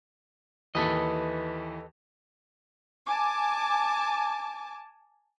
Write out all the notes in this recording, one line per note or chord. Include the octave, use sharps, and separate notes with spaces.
D#2 E3 A4 B4 D#5
G#5 A5 D6